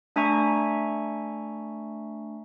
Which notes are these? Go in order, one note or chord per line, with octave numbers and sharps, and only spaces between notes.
A3 D4 E5 G#5 A#5 C#6